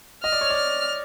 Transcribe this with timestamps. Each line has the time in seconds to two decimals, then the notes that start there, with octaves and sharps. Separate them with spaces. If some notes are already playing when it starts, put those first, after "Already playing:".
0.23 D#5 F6
0.32 D5
0.41 C#5
0.50 D5
0.56 F6